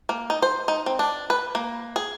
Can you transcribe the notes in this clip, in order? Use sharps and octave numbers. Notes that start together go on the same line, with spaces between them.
A#3
D#4
C5
D#4
C4
D4
B4
A#3
G#4